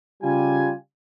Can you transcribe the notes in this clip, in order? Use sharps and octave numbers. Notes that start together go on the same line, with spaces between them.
C#3 G3 F4 G#5